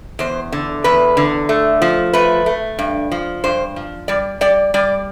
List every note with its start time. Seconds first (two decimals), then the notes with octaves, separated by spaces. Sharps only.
0.19 E2 C5
0.52 D3
0.84 E2 B4
1.17 D3
1.49 A3
1.82 F3
2.13 A3 B4
2.46 A3
2.79 G2
3.11 F3
3.44 G2 C5
3.76 F3
4.08 G3 D5
4.41 G3 D5
4.74 G3 D5